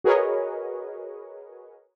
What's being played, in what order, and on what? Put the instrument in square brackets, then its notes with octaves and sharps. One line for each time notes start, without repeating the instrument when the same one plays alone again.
[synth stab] F#4 G#4 A#4 B4 C#5 D#5